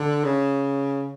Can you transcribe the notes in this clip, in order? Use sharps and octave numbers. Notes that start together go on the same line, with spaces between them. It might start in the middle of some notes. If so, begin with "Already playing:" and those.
Already playing: D3
C#3